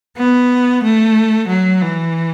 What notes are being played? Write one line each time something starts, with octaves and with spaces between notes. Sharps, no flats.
B3
A3
F#3
E3